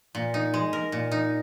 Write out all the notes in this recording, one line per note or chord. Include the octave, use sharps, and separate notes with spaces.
A#2
D#4
G#3
A#4
A#2
D#4